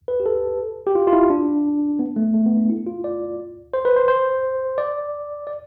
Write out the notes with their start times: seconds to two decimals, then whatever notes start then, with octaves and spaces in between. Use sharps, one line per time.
0.08 B4
0.20 G4
0.26 A4
0.87 G4
0.95 F4
1.07 F4
1.13 E4
1.30 D4
1.99 B3
2.16 A3
2.34 A3
2.46 B3
2.57 D4
2.69 E4
2.86 F4
3.04 D5
3.74 C5
3.85 B4
3.96 C5
4.08 C5
4.78 D5
5.47 D5